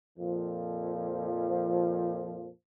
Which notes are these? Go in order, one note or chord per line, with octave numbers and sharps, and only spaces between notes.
F2 A#2 F3